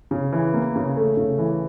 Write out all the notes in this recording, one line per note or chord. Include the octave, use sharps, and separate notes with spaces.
C#3
E3
A#3
C#3
A3
C#3
E3